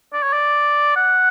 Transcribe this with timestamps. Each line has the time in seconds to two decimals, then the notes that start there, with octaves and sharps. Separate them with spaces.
0.13 D5
0.23 C#5
0.33 D5
0.96 F#5